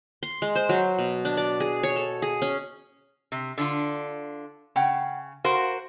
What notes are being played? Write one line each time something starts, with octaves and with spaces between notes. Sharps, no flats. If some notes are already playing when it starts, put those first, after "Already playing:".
C6
G#3
C5
F#3
B2
D4
D5
G#4
C#5
A4
G#4
C#4
C3
D3 D4 F4
C#3 F#5 G5 B5
F#4 A#4 C5 F5 B5